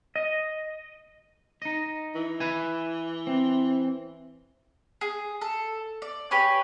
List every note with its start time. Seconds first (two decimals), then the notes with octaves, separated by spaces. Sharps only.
0.16 D#5
1.62 D#4 D#5
2.15 E3
2.40 B4 E5 G#5
3.27 C4
5.01 G#4
5.42 A4
6.02 D5
6.31 G4 B4 C#5 G#5